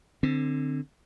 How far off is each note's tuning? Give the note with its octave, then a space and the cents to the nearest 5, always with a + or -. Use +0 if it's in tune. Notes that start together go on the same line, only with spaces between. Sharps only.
D3 +20 C4 +0